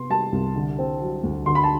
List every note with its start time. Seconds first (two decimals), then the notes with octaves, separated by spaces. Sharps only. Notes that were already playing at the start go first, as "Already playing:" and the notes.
Already playing: C3 B3 C6
0.10 G3 A5
0.32 C2
0.56 D3
0.79 C4
1.01 F#3
1.23 D2
1.46 D3 C6
1.55 B5
1.64 A5